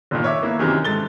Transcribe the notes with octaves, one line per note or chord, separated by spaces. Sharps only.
G1 A#2 D#3
C#5 E5 D6
A#3 B3 E4
F#2 C3 D#3 E3
G#2 A4 A6 G7